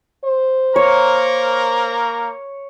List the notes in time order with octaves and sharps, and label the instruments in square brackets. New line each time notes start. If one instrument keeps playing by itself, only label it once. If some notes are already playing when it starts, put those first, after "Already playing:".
[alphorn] C5
[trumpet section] A#3 A#4 A#5 [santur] C#5